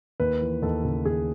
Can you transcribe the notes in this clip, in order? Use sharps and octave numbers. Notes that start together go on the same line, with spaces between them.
D#2 B4
E3
D#2 A4
C#3
D#2 G#4